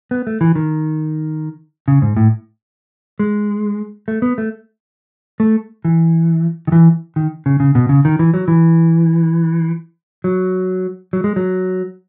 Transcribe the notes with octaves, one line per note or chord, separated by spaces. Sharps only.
B3
A3
E3
D#3
C#3
G#2
A2
G#3
A3
B3
A3
A3
E3
D#3
E3
D#3
C#3
C#3
B2
C#3
D#3
E3
F#3
E3
F#3
F#3
G#3
F#3